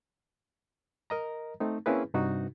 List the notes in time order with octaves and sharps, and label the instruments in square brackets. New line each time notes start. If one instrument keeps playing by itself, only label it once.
[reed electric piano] A#4 D#5 A#5
A3 C4 D#4
A#3 C4 C#4 E4 G#4 B4
G2 C3 D#4 F#4